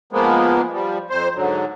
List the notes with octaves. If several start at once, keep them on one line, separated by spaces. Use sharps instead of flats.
F3 G#3 A#3 B3
F3 G3
F2 C5
G#2 D3 F#3